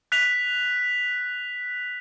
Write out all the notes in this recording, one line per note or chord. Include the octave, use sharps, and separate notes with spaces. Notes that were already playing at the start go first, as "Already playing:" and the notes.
F#6 B6 F7